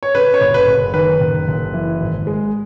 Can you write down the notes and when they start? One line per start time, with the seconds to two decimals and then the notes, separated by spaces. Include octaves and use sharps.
0.03 C#5
0.14 C#3 B4
0.34 C#5
0.41 F#1
0.54 B4
0.67 F#1
0.94 D#3 B4
1.20 F#1
1.48 F#1
1.74 E3
2.00 G#1
2.27 G#3